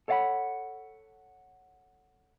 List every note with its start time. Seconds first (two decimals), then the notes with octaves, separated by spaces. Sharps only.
0.08 A4 C#5 D5 F5 F#5 B5